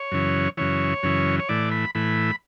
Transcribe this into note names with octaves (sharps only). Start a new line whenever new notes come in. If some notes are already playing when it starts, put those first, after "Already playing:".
Already playing: C#5
F#2 C#3 E3
F#2 C#3 E3 C#5
F#2 C#3 E3
C#5
A2 E3 D5
B5
A2 E3 B5